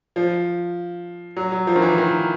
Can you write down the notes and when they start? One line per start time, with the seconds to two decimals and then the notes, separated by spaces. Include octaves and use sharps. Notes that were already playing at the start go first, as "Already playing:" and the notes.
0.16 F3
1.37 F#3
1.52 F#3
1.67 F3
1.76 D#3
1.82 E3
1.98 D#3